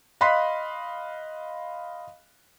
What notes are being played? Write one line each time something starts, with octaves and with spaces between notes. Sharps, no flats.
D#5 F5 B5 C6 F#6 B6